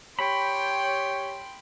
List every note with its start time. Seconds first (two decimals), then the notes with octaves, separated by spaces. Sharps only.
0.19 G4 C#5 G5 B5 C6